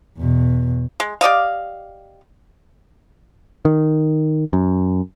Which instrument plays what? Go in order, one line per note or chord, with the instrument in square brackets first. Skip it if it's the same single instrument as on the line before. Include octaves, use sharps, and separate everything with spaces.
[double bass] E2 B2
[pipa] G#3
G4 D5 D#5 F5
[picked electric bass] D#3
F#2